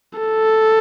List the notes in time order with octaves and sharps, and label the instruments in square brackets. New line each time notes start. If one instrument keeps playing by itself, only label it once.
[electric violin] A4